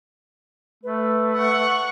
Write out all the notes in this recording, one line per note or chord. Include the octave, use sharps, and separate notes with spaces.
A3 B4
F#5 C#6